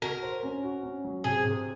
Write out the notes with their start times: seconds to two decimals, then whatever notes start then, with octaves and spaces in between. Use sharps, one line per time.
0.02 F#4 A#4
0.22 C5
0.43 C#4
0.63 F#4
0.83 C#4
1.04 F#3
1.24 C3 G#4
1.45 C3